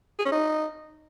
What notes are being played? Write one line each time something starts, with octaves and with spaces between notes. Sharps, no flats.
G#4
C#4
D#4